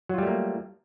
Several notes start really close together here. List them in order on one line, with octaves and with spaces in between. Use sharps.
F#3 F4 G3 A3 A#3